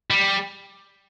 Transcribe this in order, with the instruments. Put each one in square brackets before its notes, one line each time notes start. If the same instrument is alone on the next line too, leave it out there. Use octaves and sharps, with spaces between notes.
[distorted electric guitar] G3